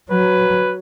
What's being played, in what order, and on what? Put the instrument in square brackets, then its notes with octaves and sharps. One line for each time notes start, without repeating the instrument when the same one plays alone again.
[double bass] F#3 [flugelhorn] B4